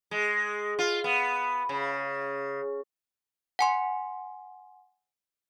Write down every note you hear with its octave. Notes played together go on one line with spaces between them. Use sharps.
G#3
F4
B3
C#3
F#5 G#5 C6